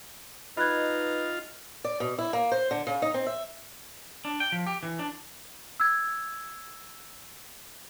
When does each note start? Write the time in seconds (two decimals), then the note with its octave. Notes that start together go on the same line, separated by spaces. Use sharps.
0.57 D#4 F4 B4 D#5 B5 F#6 G#6
1.84 D5
2.00 B2
2.19 E4
2.33 A#3
2.52 C5
2.71 D3
2.87 C#3
3.02 D#4
3.14 C4
3.27 E5
4.25 D4
4.40 G5
4.52 F3
4.67 G4
4.83 E3
4.99 D4
5.80 E6 G#6